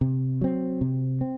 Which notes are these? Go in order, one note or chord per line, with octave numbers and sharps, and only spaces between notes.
C3
F#3 C4
C3
C4